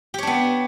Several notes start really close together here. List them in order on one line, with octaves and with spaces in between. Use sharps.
G4 C#5 D4 B3